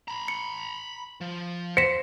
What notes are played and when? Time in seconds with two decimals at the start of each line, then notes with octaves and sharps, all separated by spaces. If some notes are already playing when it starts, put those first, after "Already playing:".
0.08 A#5 B5
0.28 C#7
1.21 F3
1.77 C5 A#6 B6 C#7 E7